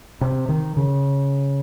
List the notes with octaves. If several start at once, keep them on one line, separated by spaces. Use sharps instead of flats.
C3
D#3
C#3